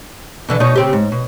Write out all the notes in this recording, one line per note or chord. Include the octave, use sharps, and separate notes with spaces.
B2 D3 E3
B2 D#4 C#5
C#3 C4 G4
G#2
B2